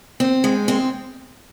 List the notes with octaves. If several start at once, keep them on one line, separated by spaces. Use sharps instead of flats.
C4
G#3
C4